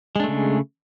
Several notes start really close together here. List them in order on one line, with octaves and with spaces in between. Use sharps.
G#3 D4 A3 C#3